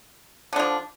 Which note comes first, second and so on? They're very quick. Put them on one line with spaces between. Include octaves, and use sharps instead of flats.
D3 D4 F3